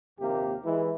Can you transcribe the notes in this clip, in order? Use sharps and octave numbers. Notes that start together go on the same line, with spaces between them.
A#1 D#2 C3 A#3 G4
E3 G#3 E4